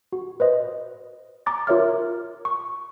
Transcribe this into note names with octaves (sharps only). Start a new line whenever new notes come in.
F#4
B4 C5 D#5
A#5 D6 A6
F4 A#4 C#5 E5 D6 F6
C#6